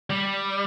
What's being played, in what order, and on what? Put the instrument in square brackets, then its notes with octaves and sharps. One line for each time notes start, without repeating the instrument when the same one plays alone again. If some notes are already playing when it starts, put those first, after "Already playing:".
[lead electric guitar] G3